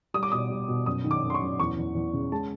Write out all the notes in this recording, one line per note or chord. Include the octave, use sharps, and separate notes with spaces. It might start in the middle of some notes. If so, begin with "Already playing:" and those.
G3 D#6
D6
B2 D#6
G3
B2
F#2 D#6
D#3
D6
F#2
C6
C#6
F#2
E2 C#6
E2
E2
C#3
G#3 A5